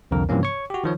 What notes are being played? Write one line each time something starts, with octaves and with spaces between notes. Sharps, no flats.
C2 F2 D3 A#4
G2 C3 E3 F3 A#3 C#4
C#5 C#6
F#4 G4
D#3 F3 C#5